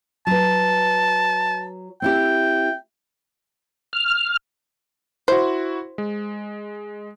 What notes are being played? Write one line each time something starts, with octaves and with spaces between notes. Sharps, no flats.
F#3 B4 A5
C4 E4 G4 G5
F6
E4 F#4 C5
G#3